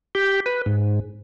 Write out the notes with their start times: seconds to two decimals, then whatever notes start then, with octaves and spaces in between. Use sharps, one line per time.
0.15 G4
0.46 B4
0.66 G#2